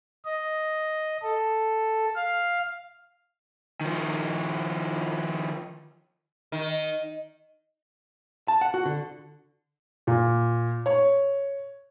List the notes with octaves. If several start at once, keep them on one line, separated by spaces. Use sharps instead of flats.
D#5
A4
F5
D#3 F3
D#3
A5
F#5
F#4
D3
A#2
C#5